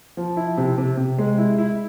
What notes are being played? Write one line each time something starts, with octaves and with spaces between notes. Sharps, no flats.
F3
E4
C3
C3
C3
G#3
E4
E4